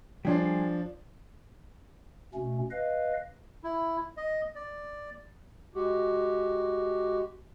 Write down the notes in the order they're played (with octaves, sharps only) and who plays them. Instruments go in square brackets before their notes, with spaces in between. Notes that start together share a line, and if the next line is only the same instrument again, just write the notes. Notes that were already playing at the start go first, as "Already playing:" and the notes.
[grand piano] F3 D4 [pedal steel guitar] G3 G#4 C6
[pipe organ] B2 A3 C#4
B4 D#5 F5
[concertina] E4
D#5
D5
[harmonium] G#3 F#4 G4